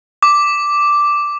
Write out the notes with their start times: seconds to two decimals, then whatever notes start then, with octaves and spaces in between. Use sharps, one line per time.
0.23 D6